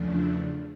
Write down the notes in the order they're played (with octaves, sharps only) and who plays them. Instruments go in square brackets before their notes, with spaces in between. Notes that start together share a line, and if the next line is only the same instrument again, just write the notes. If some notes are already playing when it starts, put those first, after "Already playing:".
Already playing: [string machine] E2 C#3 F3 A3 D4